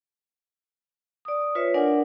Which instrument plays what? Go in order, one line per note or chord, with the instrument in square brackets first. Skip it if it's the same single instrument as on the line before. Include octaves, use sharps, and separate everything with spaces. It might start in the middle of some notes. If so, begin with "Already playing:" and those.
[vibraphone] D5 D#6
F4 B4 C#5 E5
D4 A#4 D5 F#5 G#5 D6